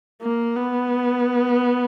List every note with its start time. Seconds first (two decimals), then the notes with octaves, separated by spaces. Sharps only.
0.22 A#3
0.56 B3